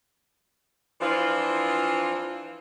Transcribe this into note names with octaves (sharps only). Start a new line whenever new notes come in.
E3 F3 C4 D4 F4